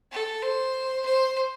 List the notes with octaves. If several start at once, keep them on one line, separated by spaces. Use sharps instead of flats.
A4
C5
C5